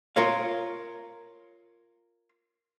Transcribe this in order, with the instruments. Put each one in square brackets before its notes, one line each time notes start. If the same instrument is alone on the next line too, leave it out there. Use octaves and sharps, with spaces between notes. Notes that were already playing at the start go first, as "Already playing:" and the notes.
[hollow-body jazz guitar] F4 A#4 C#5 F5